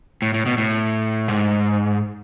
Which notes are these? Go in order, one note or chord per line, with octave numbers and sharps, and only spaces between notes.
A2
A2
B2
A2
G#2